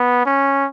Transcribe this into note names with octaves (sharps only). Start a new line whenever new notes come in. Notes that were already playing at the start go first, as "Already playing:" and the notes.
Already playing: B3
C#4